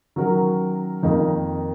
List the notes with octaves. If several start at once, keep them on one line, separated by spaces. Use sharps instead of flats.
D#3 F#3 C#4 F#4 A#4
F2 D#3 A#3 D#4 A#4